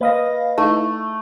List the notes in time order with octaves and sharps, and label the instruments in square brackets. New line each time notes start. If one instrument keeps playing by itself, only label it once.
[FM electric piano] A#3 F5 A#6 [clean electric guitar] B4 D#5
[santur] A3 [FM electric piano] D#4 E4